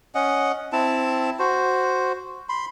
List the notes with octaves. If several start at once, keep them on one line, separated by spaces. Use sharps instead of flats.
C#4 D#5 F#5
C4 E4 A5
F#4 C5
B5 C6